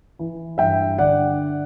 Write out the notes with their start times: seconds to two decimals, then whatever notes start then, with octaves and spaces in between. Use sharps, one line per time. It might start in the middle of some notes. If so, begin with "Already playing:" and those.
0.19 E3
0.58 G2 E5 G5
0.98 D3 D5 F#5